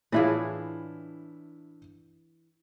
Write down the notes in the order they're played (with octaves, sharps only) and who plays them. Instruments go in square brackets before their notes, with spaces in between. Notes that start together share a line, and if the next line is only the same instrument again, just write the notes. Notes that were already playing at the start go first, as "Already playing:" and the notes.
[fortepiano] A2 E4 F4 [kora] E3 D4 G#4